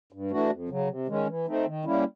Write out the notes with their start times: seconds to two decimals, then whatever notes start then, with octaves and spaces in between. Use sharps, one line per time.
0.12 G2
0.31 E3 A3 D4 F#4
0.50 F2
0.69 C#3 F#3
0.88 C3
1.08 D#3 G#3 C#4
1.27 E3
1.47 A3 C4 D#4
1.66 D#3
1.85 G3 A#3 C#4 E4